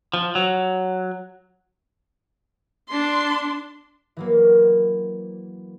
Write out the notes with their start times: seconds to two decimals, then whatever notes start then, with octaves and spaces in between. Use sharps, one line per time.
0.14 F3
0.35 F#3
2.88 D4 C6
4.17 E3 F#3 A#3